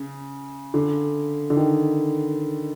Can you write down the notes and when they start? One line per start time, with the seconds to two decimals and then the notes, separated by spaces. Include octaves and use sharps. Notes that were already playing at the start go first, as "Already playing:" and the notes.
Already playing: C#3
0.74 D3
1.50 D3
1.57 D#3